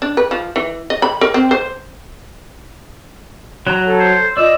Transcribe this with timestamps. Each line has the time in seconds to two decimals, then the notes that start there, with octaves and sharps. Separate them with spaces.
0.02 D4
0.17 B4
0.31 F3
0.56 E3
0.90 D#5
1.02 B5
1.21 A#4
1.34 C4
1.51 C5
3.67 F#3 A#5
3.83 A4 C#5
3.99 C5
4.37 F4 D5 D#5 E6